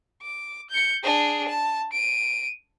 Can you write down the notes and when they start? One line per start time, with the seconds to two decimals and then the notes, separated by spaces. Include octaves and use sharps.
0.22 D6
0.70 G6 C#7
1.03 D4 G#4
1.49 A5
1.93 D7 D#7